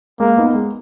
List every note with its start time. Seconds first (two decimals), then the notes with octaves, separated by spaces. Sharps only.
0.20 G#3 A#3
0.37 B3 D#4
0.54 G#3